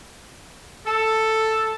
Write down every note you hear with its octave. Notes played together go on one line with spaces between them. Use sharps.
A4